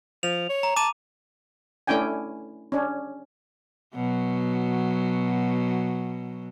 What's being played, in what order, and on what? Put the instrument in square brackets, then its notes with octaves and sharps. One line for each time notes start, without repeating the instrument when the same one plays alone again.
[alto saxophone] F3 [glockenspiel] F7
[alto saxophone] C#5
[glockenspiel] A#5
[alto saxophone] A5 [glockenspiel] D6 D#7
[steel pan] A3 C#4 D4 E4 G5 G#5
C#4 D4
[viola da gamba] B2 F#3